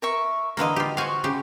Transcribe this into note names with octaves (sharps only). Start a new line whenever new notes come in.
A#4 E5 C#6
D3 E3 A#3 D#5 F5 B5
F4 G4
F#4 C5 F5 G#5 C#6
C#3 G4